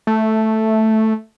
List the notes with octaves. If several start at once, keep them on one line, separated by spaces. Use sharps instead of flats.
A3